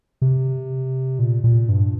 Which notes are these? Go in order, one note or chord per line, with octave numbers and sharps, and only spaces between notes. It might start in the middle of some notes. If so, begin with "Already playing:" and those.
C3
A#2
A#2
G2